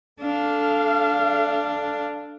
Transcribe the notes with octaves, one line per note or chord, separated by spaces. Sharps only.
D4 A4 F5